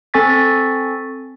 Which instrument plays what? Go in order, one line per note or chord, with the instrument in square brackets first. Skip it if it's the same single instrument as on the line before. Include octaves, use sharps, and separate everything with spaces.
[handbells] C4 A4 G#5 C#6 A6 B6